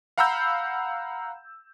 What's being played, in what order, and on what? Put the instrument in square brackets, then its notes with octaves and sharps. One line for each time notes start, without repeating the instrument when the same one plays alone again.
[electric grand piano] F5 F#5 A#5 B5 E6 G6